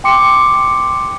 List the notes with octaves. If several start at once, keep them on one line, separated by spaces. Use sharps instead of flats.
G5 C6 D6 C#7